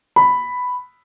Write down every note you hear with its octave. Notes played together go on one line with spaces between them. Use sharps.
B5